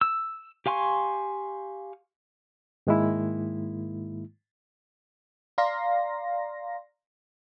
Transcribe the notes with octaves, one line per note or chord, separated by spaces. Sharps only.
E6
G4 F5 G#5 C6 C#6
G#2 D#3 G#3 A#3 E4
D5 F5 A#5 C6 A#6